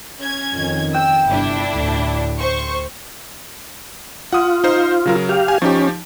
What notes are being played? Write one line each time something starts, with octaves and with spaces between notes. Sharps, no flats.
C#4 G#6
F2 D#3
G5 E6
G1 C3 D4 E4
D2 A2
C5 C#6
F4 F#5 D#6
D#4 C5
C#3 F#3 A#4
G4 F5
G#5
F3 C#4 D#4 G4